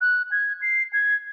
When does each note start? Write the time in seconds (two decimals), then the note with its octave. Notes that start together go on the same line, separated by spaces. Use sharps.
0.01 F#6
0.32 G#6
0.62 C7
0.93 G#6